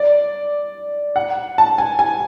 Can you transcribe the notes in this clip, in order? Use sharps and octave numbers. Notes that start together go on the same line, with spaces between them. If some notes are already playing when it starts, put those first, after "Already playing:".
Already playing: D5
F#5
A5
G#5
G#5